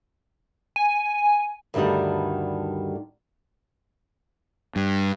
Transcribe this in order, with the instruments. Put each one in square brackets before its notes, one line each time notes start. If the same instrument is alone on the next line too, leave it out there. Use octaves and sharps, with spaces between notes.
[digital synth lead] G#5
[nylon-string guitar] D2 G2 D3 D#3 G3
[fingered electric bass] G2